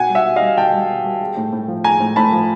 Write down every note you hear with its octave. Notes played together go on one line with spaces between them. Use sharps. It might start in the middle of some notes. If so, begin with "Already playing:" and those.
Already playing: B2 F#5 G#5
G3
E5 F#5
B2
D#5 F5
G3
B2 G5 A5
G3
B2
G3
G#3
A2
A2
F3
G#3 G#5 A#5
A2
A2 A5 B5
F3